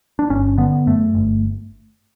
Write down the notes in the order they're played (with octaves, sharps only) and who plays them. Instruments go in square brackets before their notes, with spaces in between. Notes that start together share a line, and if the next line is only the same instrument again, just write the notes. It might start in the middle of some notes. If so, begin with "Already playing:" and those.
[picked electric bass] D4
G1 C#4
D3 B3
F#2 A3
G1